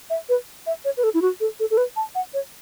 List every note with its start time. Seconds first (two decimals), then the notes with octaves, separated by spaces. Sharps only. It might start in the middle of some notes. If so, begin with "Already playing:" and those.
0.10 E5
0.29 B4
0.66 E5
0.84 C#5
0.97 B4
1.03 A4
1.14 E4
1.22 F#4
1.40 A4
1.60 A4
1.70 A4
1.77 B4
1.96 A5
2.15 F#5
2.34 C#5